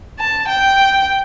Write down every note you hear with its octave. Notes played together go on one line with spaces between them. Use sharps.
A5
G5